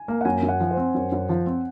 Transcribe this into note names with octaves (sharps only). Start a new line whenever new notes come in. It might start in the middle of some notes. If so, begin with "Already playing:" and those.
Already playing: G#5
A#3
F#5
F#2 G#5
F#2
F#5
F3
C5
C4
F#2
F#2
F3
C4